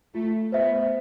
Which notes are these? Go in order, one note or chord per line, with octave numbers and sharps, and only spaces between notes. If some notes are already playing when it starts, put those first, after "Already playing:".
A3 F4
B3 C5 E5